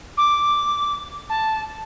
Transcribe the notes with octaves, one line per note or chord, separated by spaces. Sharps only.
D6
A5